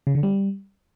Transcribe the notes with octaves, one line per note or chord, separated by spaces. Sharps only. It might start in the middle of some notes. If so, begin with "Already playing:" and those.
C#3
D3
G3